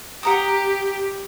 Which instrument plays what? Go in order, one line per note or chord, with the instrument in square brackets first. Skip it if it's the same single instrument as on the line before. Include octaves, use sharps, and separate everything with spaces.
[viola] G4 [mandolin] F#5 A#5 D#6